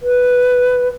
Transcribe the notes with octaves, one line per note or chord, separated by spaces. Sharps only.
B4